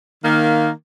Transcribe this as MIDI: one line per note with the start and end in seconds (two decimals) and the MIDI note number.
0.25 0.70 51
0.25 0.70 58